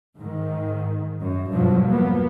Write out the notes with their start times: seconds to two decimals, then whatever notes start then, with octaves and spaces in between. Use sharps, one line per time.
0.19 G#2 D#3
1.22 F#2
1.50 E2 G2 B2 F3 F#3
1.87 A#3 B3